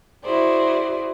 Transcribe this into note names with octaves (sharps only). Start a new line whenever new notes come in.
E4 F#4 G#4 C5 D5